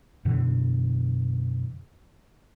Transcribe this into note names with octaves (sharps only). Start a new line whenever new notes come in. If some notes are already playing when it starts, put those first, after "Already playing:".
F#2 B2 D3 E3